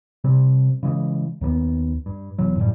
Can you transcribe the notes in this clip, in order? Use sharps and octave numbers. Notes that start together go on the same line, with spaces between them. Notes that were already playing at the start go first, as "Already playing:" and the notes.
C3 G3 C4
C#3 E3 F#3 G#3
D#2 D#3 A#3 B3
G2
E1 B2 E3 F#3
F#2 A2 G3